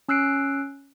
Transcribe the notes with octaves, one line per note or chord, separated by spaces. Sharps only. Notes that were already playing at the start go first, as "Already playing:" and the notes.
C#4 E6 F#6 C7 D7